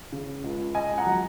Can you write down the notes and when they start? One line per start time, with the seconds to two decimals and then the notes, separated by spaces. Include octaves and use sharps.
0.12 C#3
0.44 C#2
0.74 C#2 D#5 G#5
0.98 F#5 A#5
1.06 F#3